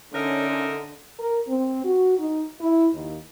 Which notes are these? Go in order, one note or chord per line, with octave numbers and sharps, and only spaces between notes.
D3 C#4 D#4 A#4 E5
A#4
C4
F#4
D#4
E4
D#2